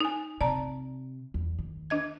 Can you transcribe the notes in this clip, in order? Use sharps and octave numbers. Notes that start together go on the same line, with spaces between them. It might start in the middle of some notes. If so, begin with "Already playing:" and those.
D#4 G#5
C3 D5 A5 A#5
E2
D#3
D4 D#5 G#6